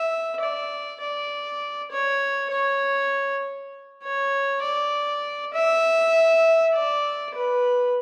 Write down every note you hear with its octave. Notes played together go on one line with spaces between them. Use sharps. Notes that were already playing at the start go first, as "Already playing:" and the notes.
Already playing: E5
D5
D5
C#5
C#5
C#5
D5
E5
D5
B4